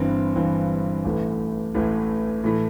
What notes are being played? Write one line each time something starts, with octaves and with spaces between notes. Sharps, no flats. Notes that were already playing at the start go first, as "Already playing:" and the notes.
Already playing: G1 G2 E3 C4
G1 G2 E3 C4
A1 A2 E3 A3
A1 A2 E3 A3
A2 E3 A3 E4